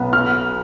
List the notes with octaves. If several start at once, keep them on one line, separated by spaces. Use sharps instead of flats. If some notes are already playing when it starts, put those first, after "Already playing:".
Already playing: B1 B3
F6